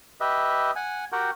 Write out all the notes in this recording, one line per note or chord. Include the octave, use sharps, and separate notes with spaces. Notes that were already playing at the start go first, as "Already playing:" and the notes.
G4 B4 D#5 E5
F#5 G#5
F#4 G4 A#4 F#5 G5